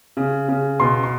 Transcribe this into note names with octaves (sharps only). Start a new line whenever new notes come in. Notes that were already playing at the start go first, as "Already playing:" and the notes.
C#3
C#3
B2 C6
C6